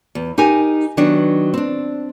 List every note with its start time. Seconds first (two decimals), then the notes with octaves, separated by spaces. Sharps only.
0.15 E2
0.38 D#4 G4 A#4 G#5
0.97 D#3 F#3 B3 D4
1.54 C4 D4